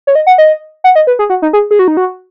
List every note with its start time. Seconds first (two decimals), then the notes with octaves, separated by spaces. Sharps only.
0.07 C#5
0.15 D#5
0.27 F#5
0.38 D#5
0.84 F#5
0.95 D#5
1.07 B4
1.19 G#4
1.30 F#4
1.42 D#4
1.53 G#4
1.71 G#4
1.79 F#4
1.88 D#4
1.97 F#4